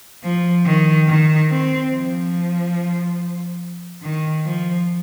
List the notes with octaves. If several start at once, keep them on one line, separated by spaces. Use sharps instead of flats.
F3
D#3
D#3
C4
F3
D#3
F3